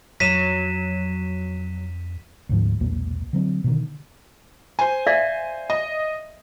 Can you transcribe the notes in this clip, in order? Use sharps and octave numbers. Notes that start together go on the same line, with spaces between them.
F2 F#3 B6 D#7 E7
D2 G#2 F3
B1 E2 A#2 A#3
D3 F#3 C4
B2 D3 D#3
C5 G#5
D5 E5 F5
D#5